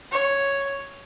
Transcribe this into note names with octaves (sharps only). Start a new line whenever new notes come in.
C#5